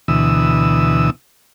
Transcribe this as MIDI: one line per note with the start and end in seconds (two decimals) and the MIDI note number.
0.08 1.10 38
0.08 1.10 47
0.08 1.10 52
0.08 1.10 87
0.08 1.10 88